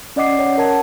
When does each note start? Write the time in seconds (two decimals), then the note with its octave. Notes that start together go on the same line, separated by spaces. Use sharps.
0.16 C#4 D5 D#5 F#5 D6 C7
0.37 C#4 C#5 F#5
0.58 A#4 D#5 A5 G#6